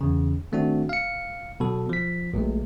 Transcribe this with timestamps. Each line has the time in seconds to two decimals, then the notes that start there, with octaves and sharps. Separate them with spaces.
0.01 E2 C#3
0.52 D#3 A3 C4 D4 F#4
0.89 F5 C#7
1.60 B2 F#3 A4
1.89 F3 B6
2.34 A#1 A#2 G#3 A3